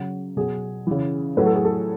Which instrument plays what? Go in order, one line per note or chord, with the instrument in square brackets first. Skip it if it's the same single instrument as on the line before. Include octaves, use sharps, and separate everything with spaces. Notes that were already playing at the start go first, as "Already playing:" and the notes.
Already playing: [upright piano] C#3 F#3
B2 F#3 G#4
C#3 E3
A2 F#3 B4
A4
G#4
A4